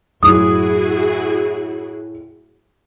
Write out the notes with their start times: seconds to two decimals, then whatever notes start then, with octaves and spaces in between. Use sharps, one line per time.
0.23 F#2 A2 E4 F#4 G#4 D#6